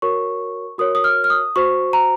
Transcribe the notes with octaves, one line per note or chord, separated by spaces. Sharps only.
F#4 A#4 C#5 C#6
F#4 A#4 C#5 D#6
D#6
F6
F6
D#6
F#4 C5 C#6
A#5